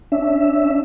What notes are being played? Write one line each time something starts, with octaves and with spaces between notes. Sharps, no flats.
C#4 D4 E5